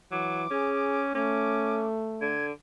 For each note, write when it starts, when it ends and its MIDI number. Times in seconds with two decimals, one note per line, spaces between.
0.12 0.48 52
0.12 0.44 54
0.12 1.12 86
0.51 1.14 61
0.51 1.03 68
1.15 2.35 57
1.15 1.85 61
1.15 1.86 86
2.21 2.52 50
2.21 2.46 92